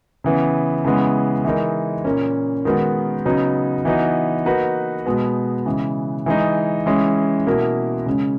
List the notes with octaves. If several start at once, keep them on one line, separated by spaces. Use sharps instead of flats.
C#3 E3 B3
C#3 E3 G#3 B3
E3 G#3 D#4 A#4
A#2 A#3 C#4
D#3 G#3 B3 F#4
C#3 F#3 B3 D#4
E3 B3 D#4 F#4
A#3 D#4 F#4 B4
B2 G#3 B3
C#3 E3 G#3
E3 G#3 D#4
E3 G#3 C#4
B2 A#3 E4 A#4
C#3 G#3 C#4